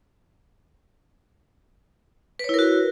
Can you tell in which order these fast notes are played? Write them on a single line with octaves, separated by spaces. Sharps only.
B4 C#5 E4 A#4 F#4